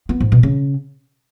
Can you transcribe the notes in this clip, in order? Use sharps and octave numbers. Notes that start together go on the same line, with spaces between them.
B3
G#2
B2
C#3